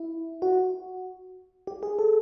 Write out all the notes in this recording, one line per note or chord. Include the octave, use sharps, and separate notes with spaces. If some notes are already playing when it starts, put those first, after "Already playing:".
Already playing: E4
F#4
G4
G#4
A4